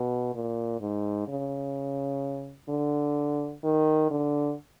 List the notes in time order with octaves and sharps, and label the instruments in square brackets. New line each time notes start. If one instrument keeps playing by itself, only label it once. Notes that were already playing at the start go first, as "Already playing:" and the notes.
Already playing: [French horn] B2
A#2
G#2
C#3
D3
D#3
D3